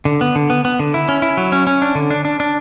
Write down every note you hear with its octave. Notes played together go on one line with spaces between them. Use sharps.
D3
B3
D3
B3
B3
D3
E4
C#4
E4
F#3
C#4
C#4
D4
D3
D4
D4
D4